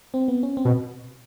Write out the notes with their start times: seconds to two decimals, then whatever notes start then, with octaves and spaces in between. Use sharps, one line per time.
0.14 C4
0.28 B3
0.43 C#4
0.57 C4
0.65 B2